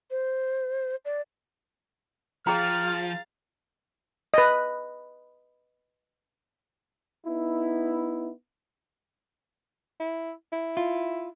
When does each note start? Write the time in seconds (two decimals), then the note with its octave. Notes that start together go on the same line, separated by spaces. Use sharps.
0.11 C5
1.05 D5
2.47 F3 G#4 F5 G5 A#5 F6 A6
4.34 B4 D#5
7.26 B3 D#4 E4
10.00 E4
10.52 E4
10.77 F4